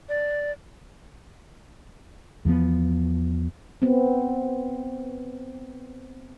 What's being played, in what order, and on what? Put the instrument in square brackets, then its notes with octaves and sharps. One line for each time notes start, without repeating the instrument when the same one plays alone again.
[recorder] D5
[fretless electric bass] E2 F3 F#3 B3
[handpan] B3 C4